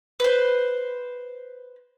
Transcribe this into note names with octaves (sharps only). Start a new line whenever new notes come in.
B4 C5